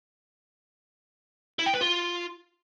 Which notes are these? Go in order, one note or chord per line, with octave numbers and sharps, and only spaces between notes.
E4
G5
B4
F4